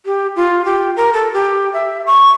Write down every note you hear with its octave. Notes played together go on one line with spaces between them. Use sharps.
G4
F4
G4
A#4
A4
G4
E5
C#6